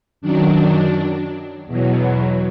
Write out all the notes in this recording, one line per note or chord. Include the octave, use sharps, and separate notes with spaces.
F#2 D#3 F#3 D4
E2 B2 F#3